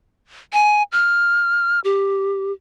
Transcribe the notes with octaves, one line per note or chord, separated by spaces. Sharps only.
G#5
F6
G4